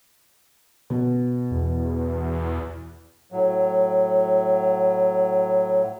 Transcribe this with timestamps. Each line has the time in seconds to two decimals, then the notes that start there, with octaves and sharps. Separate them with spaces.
0.90 B2
1.51 E2
3.32 A2 F#3